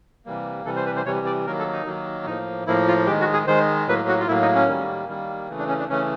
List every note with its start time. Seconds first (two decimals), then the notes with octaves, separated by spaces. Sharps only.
0.26 C3 E3 G3 A#3
0.65 C3 E3 G3 A4
0.76 C5
0.86 B4
0.96 C5
1.06 C3 E3 G3 C#5
1.26 D5
1.46 D#3 F#3 A#3 A#4
1.59 A4
1.73 D#4
1.86 D#3 F#3 A#3
2.26 A2 F3 A#3 D#4
2.67 A2 F3 A#3 E4
2.88 F4
3.07 D#3 G#3 G4
3.21 F#4
3.33 G#4
3.47 D#3 G#3 C5
3.88 A2 F#3 A#3 B4
4.08 F#4
4.20 F4
4.28 A2 F#3 A#3 E4
4.42 D#4
4.55 C#4
4.68 D#3 G3 A#3
5.08 D#3 G3 A#3
5.49 C#3 E3 A3
5.59 D4
5.69 C#4
5.80 D4
5.89 C#3 E3 A3 C#4